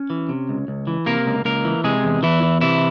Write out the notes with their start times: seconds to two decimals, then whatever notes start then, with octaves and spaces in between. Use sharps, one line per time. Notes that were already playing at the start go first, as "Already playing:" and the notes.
Already playing: C#4
0.10 E3
0.29 C3
0.49 C#2
0.68 C#2
0.87 E3
1.06 C3 A#3 A#4
1.26 C#2
1.45 C#2 A#3 A#4
1.65 E3
1.84 C3 G#3 G#4
2.04 E2
2.23 E2 E3 E4
2.43 E3
2.61 C3 E3 E4